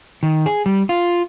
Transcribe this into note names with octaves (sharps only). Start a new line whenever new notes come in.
D#3
G#4
G3
F4